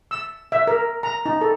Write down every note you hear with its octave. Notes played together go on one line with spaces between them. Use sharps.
E6
E5
A#4
A#5
D#4
A4